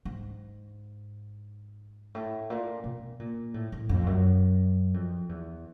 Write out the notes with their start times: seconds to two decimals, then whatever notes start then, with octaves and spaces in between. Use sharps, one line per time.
0.05 G#2
2.15 A2
2.50 A#2
2.84 B2
3.20 A#2
3.54 A2
3.72 A2
3.89 F2
4.07 F#2
4.94 F2
5.29 E2